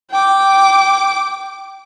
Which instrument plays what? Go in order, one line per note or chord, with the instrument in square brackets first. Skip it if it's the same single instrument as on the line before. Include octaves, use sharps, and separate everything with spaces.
[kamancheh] G5 D6